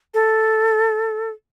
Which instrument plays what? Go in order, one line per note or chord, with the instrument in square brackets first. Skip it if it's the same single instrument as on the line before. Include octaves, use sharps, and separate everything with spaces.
[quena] A4